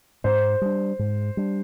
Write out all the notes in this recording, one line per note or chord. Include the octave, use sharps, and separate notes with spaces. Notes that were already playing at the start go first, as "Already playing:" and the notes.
G#2 C5
G3 D4
G#2
G3 D4